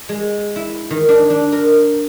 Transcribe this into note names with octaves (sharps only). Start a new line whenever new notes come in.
G#3
E4
D#3
D4
D4
A#4